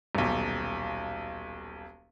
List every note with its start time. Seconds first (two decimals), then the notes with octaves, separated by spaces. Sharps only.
0.15 D#1 B1